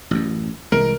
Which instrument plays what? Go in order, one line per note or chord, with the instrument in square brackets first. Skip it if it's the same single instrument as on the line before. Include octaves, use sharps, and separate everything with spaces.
[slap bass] A1 F#2
[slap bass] C2 E3 G#3 [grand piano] A#4